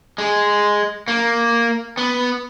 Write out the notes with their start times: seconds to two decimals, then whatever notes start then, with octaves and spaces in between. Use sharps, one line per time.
0.18 G#3
1.08 A#3
1.97 B3